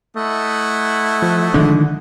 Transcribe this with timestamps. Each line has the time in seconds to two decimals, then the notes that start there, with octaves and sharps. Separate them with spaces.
0.16 A3 E4 D#5 F#5
1.22 F3
1.54 D3 D#3 F3 G#3